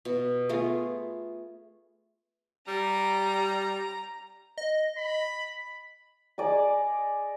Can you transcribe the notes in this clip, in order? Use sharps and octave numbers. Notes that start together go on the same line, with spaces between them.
B2
A3 B3 F4 G#4
G3 A#5
D#5
B5
G#4 D5 D#5 A#5